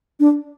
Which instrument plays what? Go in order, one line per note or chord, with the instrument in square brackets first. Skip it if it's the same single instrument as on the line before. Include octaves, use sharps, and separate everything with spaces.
[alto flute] D4